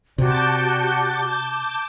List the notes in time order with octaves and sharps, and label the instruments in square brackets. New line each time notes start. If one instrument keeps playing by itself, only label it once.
[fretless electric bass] C3 [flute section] F#4 G4 D5 [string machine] A5 D6 G6